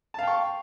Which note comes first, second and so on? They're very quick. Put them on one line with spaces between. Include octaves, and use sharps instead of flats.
A5 F5 G5 C#6